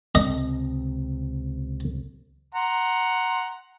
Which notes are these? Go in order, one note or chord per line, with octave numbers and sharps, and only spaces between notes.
C#2 C3 C4 D#5
F#5 A#5 C6